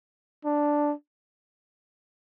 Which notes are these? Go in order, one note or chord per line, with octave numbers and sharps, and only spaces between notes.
D4